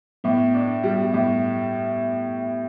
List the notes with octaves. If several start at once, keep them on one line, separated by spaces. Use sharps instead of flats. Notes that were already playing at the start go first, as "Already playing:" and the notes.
A2 B3
D4
G3
A2